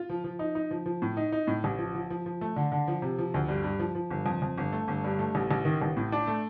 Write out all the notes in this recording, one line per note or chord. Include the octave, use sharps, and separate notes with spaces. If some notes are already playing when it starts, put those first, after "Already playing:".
Already playing: F4
F3
F3
D#4
D#4
F3
F3
A2
D#4
D#4
A2
A1
F3
F3
F3
F3
A3
D3
D3
F3
C3
F3
D2
G2
G2
F3
F3
G1
F2
F2
G1
A3
G1
G2
A3
A1
A1
D#3
A1
A2
D4
A3